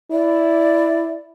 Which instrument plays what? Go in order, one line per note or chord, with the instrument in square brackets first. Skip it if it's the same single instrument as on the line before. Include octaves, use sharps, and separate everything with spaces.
[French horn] E4 [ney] D5